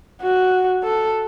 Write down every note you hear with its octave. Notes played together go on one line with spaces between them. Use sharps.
F#4
A4